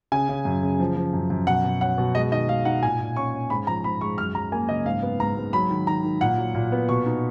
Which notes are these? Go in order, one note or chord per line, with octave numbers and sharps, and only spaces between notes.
C#3 G#5
C#3
F#2
C#3
F3
F3
F#2
F#2
B2 F#5
B2
C#4 F#5
B2
G#3 D#5
D#3 D#5
G#3 F5
D#4 F#5
A#2 G#5
A#2
C#4 C#6
C#4
G#2 B5
F3 A#5
G#2 B5
G#3 C#6
F#2 F6
F#3 A#5
A#3 G#5
C#3 D#5
G#2 F5
B3
G#2 A#5
G#2
F#3 B5
D#3
D#3 A#5
D#3
A#2 F#5
F#3
A#2
B3
B2 C#6
D#4